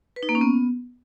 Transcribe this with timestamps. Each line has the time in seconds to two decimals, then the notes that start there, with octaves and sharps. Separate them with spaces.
0.16 B4
0.23 D#4
0.29 A#3
0.35 C#4
0.41 B3